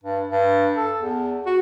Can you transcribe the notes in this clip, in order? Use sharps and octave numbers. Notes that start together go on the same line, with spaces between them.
G2
G2
A4
E2
F#4